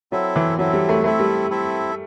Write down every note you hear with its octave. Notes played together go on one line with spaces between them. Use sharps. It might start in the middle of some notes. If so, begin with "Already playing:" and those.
F#3 C4 E4 A4 E5
E3
F#3 C4 E4 A4 E5
G3
A3
A3 C4 E4 A4 E5
G3
C4 E4 A4 E5